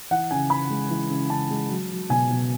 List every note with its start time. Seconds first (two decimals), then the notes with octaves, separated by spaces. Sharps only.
0.11 E3 F#5
0.31 C#3 G#5
0.50 C#3 B5
0.70 G#3
0.90 E3
1.10 C#3
1.30 C#3 A5
1.50 G#3
1.70 F#3
1.90 F#3
2.10 B2 G#5
2.31 B2